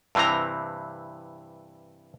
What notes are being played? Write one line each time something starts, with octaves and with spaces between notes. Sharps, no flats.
G2 C3 E3 C4 A#5